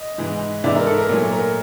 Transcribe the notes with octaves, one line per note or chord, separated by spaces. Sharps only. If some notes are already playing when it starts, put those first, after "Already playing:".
Already playing: D#5
G#2 E3 G#3
G#2 E3 G#3 D5 E5
A#4
A4
A#4
A#2 F#3 A3
A#4